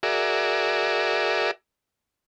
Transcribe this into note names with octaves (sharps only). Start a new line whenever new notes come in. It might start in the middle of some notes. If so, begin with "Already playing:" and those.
F#4 G#4 A#4 D5 E5